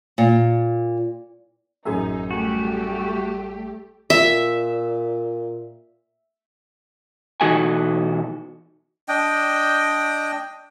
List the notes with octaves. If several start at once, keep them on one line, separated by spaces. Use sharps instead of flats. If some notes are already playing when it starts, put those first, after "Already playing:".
A#2
A1 F#2 D#4 G#4 E5
G3 A3 F#4 G4
A#2 E5
B2 E3 D#4 F#4 A4 G#5
D4 D#5 G5